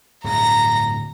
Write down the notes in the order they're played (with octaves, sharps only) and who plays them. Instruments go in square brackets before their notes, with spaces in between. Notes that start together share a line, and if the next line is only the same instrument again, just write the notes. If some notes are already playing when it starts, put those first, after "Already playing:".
[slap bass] D1 G2 [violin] A#5 A#6